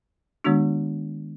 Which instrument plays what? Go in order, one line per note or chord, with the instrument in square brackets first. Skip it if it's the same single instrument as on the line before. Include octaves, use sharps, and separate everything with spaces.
[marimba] D#3 G#3 B3 D4 F#4